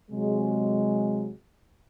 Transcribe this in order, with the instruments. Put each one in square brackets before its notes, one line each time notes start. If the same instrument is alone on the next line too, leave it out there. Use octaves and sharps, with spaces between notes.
[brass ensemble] C3 F#3 G#3